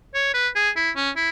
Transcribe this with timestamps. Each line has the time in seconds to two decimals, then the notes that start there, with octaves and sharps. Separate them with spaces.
0.14 C#5
0.34 B4
0.56 G#4
0.76 E4
0.96 C#4
1.16 E4